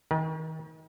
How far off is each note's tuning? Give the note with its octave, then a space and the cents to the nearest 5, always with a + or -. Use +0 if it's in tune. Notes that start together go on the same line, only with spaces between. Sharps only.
D#3 +35 A#4 +45 G#5 +0